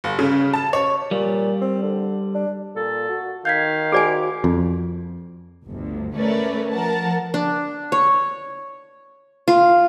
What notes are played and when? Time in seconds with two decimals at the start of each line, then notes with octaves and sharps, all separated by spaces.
0.04 G1
0.19 C#3
0.54 A5
0.73 C#5
1.11 A#2 G3
1.61 C4
1.82 D3
2.34 D4
2.76 A#2 A4
3.09 F#4
3.45 D#3 F5 G6 G#6 B6
3.92 F#4 G#4 C5 D5 G#5 D7
4.44 F2
5.65 G1 D2
6.16 A3 C#4 A#4 B4 C#5 D5
6.71 F3 A#4 F#5 A5
7.34 D4
7.92 C#5
9.48 F4